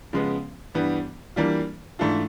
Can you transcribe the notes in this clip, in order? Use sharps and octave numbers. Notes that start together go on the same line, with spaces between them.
C#3 F3 G#3 B3
G2 E3 G3 B3
E3 G3 A#3 D4 F4
G#2 E3 A3 D4 F4